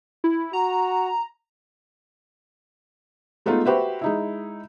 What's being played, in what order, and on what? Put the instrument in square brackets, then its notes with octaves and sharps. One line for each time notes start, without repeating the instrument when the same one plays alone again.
[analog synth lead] E4
[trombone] F#4 [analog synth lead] A#5
[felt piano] G#3 A3 B3 D#4 F4
F#4 G4 B4 C5 E5
G#3 D#4 E4